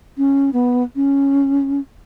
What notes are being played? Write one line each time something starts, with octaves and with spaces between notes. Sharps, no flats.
C#4
B3
C#4